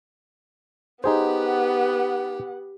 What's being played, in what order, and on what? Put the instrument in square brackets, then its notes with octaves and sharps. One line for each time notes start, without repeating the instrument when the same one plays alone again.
[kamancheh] B3 F#5 [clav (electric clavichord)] D#4 G#4 C5 [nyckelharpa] G4